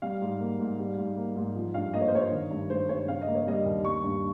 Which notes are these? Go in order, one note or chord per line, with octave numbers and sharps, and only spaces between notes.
G3 F5
G#2
A#3
G#2
G3
G#2
A#3
G#2
F3
G2 F5
A#3 D#5
C#5
C5
G2 C#5
D#3
G2
G#3 C5
G2 C#5
C#3 F5
D#5
A#3
C#5
G3 D#5
D#2
G3 C#6
G2